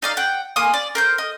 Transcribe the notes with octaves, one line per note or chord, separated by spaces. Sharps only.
D#4 D5 F5
F#5 G5
A#3 G#5 C6 D#6
D5
A#4 C5 G6
D#5